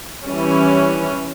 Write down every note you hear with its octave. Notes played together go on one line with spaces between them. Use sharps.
E3 G3 C#4